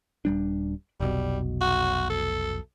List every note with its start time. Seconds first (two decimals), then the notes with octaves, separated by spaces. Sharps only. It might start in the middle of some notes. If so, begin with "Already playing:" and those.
0.25 D#1 G3 D4
1.00 F1 B1 B2 G3
1.61 F#4
2.10 A4